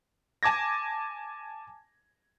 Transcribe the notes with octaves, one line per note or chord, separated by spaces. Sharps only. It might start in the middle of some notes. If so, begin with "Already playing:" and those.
G#5 A5 D6 G#6 A#6